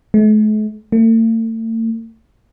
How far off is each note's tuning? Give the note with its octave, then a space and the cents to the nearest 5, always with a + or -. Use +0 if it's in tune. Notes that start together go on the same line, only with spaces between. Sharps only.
A3 -45
A3 +45